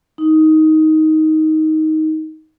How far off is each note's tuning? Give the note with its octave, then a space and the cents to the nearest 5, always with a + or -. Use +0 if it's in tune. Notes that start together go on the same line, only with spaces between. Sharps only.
D#4 +10